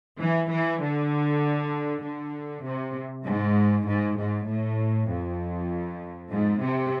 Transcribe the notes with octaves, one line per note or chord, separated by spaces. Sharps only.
E3
E3
D3
D3
C3
G#2
G#2
G#2
A2
F2
G#2
C3